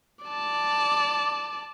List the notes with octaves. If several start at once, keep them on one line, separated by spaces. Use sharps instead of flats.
D5 A5